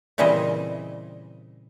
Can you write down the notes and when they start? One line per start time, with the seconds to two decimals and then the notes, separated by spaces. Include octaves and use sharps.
0.18 A#2 C#3 E3 G3 C4 D#5